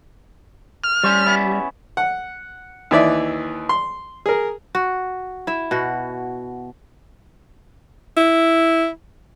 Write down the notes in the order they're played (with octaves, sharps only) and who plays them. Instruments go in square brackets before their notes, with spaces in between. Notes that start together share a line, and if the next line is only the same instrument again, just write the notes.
[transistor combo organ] F6
[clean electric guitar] A2 C#4 C5 [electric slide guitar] G3
[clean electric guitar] B3 C#4 E4
[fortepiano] F#5
D#2 E3 D5 E5
C6
G#4 A#4
[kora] F#4
E4 E5
B2 F#4
[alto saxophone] E4